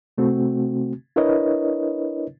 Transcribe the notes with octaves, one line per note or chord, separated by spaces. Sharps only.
C3 A3 C4 F#4
D4 E4 A#4 B4 C#5 D#5